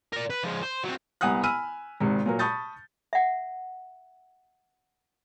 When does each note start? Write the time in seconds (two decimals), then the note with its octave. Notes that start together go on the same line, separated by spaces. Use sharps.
0.13 A#4 D5
0.30 B4
0.44 F3 G#3
0.63 C5
0.84 F#3 C4
1.21 C2 B3 F#5 G#5 D#6 F#6
1.43 G#5 B5 E6 F6 D#7
2.00 G#1 G#2 C3
2.26 A#2 F#3 A#4
2.39 A5 B5 C#6 D#6 G6 A6
3.13 E5 F#5